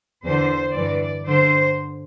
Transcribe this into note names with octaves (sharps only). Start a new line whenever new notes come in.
E2 D3 C5
G2 E3 D5
G2 D3 C5